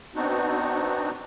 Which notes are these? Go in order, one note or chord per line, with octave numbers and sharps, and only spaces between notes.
B3 C4 D4 D#4 F#4